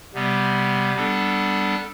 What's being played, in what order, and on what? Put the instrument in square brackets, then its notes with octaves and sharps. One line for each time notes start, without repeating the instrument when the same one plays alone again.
[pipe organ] C3 G3 B3
G3 B3 D4 A4